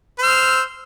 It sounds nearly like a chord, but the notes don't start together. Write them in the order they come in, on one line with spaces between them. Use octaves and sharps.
C5 F6 E6